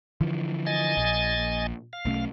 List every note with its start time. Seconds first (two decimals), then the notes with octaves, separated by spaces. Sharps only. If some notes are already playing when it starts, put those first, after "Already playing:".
0.21 D3 E3 F3
0.66 D#5 G#5 A6
0.97 A#1
1.93 F5
2.05 B1 A3 C#4